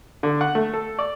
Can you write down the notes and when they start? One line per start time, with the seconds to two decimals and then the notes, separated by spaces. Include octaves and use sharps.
0.23 D3
0.41 F#5
0.55 A3
0.73 A4
0.99 D5